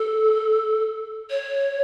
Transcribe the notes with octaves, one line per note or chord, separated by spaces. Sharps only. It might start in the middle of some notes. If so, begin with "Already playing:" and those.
Already playing: A4
C#5